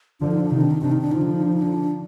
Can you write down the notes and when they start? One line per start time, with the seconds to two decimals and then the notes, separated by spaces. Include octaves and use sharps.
0.20 D3 F3 D4
0.31 D#4
0.40 D4
0.50 C3 D#3 D#4
0.61 D4
0.71 D#4
0.81 C3 D#3 D4
0.92 D#4
1.01 D4
1.10 D3 F3 D#4
1.21 D4
1.31 D#4
1.42 D4
1.52 D#4
1.62 D4